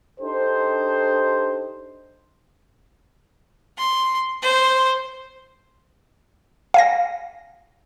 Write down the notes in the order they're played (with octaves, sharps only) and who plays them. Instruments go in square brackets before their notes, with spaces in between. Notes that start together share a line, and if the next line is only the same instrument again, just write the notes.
[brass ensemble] D4 D#4 G4 A4 C5
[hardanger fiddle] C6
C5
[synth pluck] F5 G#5 A#6